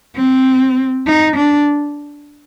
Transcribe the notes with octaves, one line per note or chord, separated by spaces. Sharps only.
C4
D#4
D4